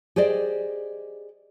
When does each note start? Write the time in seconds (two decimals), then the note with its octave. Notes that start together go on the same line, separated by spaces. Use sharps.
0.16 G4 G#4 C5 D5 D#5